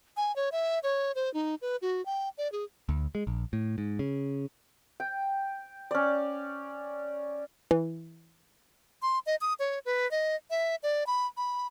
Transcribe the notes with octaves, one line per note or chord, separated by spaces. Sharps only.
G#5
C#5
E5
C#5
C5
D#4
B4
F#4
G5
D5
G#4
D2
G#3
A#1
A2
G#2
C#3
G5
C#4 D5
E3
C6
D#5
D#6
C#5
B4
D#5
E5
D5
B5
B5